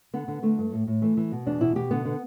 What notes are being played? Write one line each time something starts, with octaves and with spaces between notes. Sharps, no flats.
D3 B3
D3
D3 A3
G2
A2
A2
E3 A3
E3
B2
E2 D4
B2 E4
B2 G4
D3 B3
D3